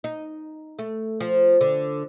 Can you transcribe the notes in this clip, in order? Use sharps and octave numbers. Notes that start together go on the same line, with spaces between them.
D#4
A3
F3
D3